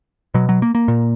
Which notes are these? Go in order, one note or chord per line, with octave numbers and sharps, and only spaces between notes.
B2 F#3
F#3
A#3
A#3
A#2